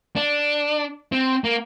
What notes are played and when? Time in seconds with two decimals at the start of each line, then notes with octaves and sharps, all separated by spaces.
0.16 D4
1.12 C4
1.44 A#3